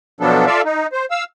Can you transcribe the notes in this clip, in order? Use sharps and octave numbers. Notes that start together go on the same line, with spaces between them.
B2 F3 F#3 B3 D4 A4
F4 A4 D5 E5 F5
D#4
C5
F5 E6